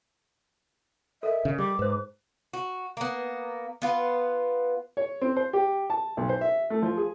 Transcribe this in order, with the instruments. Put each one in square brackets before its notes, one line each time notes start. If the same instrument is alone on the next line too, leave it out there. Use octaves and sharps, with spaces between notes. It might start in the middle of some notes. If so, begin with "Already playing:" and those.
[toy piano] A4 A#4 D#5 [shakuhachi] E5
[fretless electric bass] C#3
[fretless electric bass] G3 [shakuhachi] D6
[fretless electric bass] G#2 [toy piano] B4 C5
[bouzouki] F#4
A#3 B3
B3 F4 B4
[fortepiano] C#5
C4
C5
G4
A5
B1
C5
E5
A3
F3
G#4